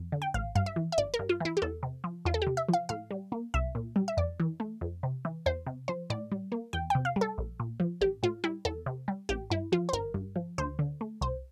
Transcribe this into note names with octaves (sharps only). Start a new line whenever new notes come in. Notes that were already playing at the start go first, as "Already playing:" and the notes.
Already playing: F2
D3
G5
A1 F5
G2 F5
E5
E3
E5
G1 D5
A#4
G2
F4
E3 E4
G4
E2 A4
C3
F3
E2 F4
A4
G4
C3
E5
F3 F5
A2 F5
G3
A#3
C2 E5
A#2
G3
E5
F2 D5
E3
A3
F2
C3
E3
E2 C5
C3
F3 C5
A2 D5
G3
A#3
E2 G5
C3 G5
F5
G3
A4
A#1
A#2
F3
A1 G4
A2 F4
G3 E4
E2 A4
C3
G3
A1 G4
G2 E4
F3 F4
C5
G1 A#4
G2
F3
D2 C5
D3
A3
C2 C5